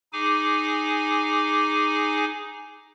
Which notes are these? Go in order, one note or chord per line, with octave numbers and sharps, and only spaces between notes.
D#4 G#4 G#5 D6